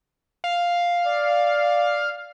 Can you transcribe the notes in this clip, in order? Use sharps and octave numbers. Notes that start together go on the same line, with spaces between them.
F5
D5